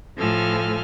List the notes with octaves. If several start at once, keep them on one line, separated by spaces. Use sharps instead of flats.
A2 F3 A4 G#5 F6